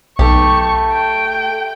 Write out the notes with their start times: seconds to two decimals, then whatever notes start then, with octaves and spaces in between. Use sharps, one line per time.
0.19 B1 A3 G4 C#6
0.92 G5